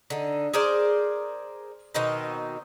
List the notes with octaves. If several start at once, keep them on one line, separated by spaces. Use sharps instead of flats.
D3 D#4
G#4 A#4 C5 D5
B2 D#3 C4 D#4